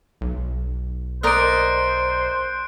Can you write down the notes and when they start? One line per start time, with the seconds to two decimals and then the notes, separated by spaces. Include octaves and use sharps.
0.21 B1
1.23 A#4 C5 D5 D#5 F#6 D7